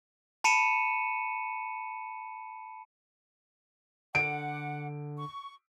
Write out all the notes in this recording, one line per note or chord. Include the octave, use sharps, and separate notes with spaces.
A5 B5 C#7 D#7 E7
D3 F#5 D6 D7
C#6